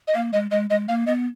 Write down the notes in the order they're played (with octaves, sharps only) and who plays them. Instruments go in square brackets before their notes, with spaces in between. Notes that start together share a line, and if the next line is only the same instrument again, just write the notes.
[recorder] D#5
[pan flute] A#3 [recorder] F5
[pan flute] G#3 [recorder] D#5
[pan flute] G#3 [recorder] D#5
[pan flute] G#3 [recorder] D#5
[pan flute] A#3 [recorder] F5
[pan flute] B3 [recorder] D#5